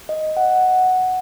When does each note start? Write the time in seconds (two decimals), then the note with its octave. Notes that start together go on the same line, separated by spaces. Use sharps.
0.09 D#5
0.37 F#5